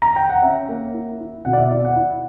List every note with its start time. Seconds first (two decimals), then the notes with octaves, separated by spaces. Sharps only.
0.02 A#5
0.16 G5
0.30 F#5
0.42 C#4 E5
0.69 A#3
0.94 E4
1.20 E4
1.45 B2 F#5
1.53 D5
1.58 E5
1.71 E4 D5
1.85 F#5
1.96 E4